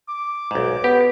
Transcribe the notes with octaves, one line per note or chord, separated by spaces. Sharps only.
D6
B1 G#2
B3 G4